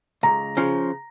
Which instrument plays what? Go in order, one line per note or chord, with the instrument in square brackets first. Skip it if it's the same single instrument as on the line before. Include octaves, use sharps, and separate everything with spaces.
[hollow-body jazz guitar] C#2 [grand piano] A#5
[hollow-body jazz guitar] C#3 F3